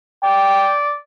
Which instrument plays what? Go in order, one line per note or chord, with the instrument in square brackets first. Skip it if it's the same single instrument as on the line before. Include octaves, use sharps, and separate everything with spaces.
[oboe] D5 [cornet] G5